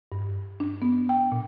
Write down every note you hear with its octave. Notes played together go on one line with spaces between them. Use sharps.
G2
D4
B3
G5
A#2